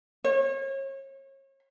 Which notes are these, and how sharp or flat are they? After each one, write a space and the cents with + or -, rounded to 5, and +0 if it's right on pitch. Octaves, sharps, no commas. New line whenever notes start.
C#5 -35